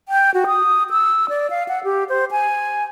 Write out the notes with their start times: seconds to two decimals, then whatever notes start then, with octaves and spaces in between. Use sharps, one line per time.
0.09 G5
0.34 F#4
0.47 D#6
0.91 E6
1.29 D5
1.50 F5
1.68 F#5
1.84 G4
2.09 C5
2.31 G#5